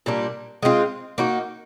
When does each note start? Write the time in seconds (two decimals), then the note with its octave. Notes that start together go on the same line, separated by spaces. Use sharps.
0.06 A#2 G3 A#3 D4
0.62 G#3 C4 F4
1.18 A#3 D#4 F#4